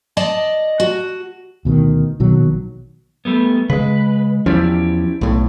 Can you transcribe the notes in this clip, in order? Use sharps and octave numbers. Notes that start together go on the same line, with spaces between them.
D5 D#5 A5
F#4
D2 B2 D3 D#3
A#1 B2 D#3 F#3
G3 A3 B3
C#3 G#3 B4
E2 F3 C#4 E4 G4 D5
B1 A2